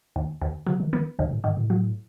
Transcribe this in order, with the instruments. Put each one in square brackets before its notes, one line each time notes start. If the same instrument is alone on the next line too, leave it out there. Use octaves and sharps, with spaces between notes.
[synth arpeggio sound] D#2
D#2
[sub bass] C3 [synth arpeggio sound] F#3
[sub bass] D#3
[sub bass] D#3 [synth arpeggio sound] B3
[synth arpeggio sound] D#2 [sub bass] B2
[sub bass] A2
[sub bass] G2 [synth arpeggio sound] D#3
[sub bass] A2
[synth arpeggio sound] F#3